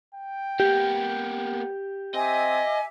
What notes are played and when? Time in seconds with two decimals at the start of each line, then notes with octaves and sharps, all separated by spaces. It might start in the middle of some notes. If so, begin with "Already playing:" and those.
0.14 G5
0.60 A#3 B3 G4
2.14 C4 D#5 E5 G#5 D6